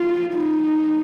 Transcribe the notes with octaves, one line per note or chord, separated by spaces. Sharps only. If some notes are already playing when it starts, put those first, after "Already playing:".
Already playing: F4
D#4